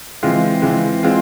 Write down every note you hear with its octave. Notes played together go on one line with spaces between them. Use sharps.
E3 G#3 C4 F4
E3 G#3 C4 F4
G#3 C4 F4